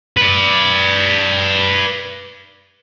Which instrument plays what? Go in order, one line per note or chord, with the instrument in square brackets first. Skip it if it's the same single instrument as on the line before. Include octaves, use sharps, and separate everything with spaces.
[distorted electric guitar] B4 D5